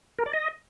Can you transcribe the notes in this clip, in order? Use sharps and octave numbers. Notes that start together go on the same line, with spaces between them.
A#4
D5
D#5